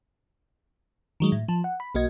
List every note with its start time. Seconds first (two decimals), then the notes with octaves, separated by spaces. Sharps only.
1.20 D#3 F#3 G#3
1.32 A2
1.48 F3 A5
1.64 F#5
1.80 B5
1.95 B1 A#3 F#4 D#5 G#6